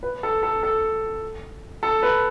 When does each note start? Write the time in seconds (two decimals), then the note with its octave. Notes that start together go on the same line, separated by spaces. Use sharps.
0.03 B4
0.23 A4
0.43 A4
0.63 A4
1.83 A4
2.03 B4